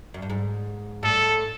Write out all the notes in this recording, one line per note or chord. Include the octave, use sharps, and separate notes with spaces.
F#2
G2
G#2
A2 A4